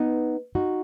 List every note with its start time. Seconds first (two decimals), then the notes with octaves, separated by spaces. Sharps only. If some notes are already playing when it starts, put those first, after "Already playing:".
Already playing: B3 D#4
0.55 D#4 F#4